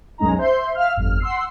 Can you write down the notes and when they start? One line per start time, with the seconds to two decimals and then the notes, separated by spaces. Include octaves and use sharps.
0.18 B1 F#2 G#3 C#4 D#4 A#5
0.38 C5 E5 C6 G6
0.75 E5 F5 F6
0.96 G1 F2 F6
1.20 F#5 C6 E6 C7